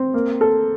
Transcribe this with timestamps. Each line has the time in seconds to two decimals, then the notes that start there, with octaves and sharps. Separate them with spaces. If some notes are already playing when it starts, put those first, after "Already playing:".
Already playing: C4
0.14 A#3
0.41 A4